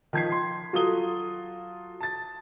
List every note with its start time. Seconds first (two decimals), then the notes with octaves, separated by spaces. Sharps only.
0.13 D#3 F3 A5 G#6 B6 C7
0.32 C6
0.73 F#3 F4 F#4 A4 D#6 G7
2.01 A5 A6